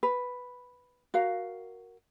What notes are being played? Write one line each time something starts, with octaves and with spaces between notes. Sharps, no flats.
B4
F#4 A#4 F5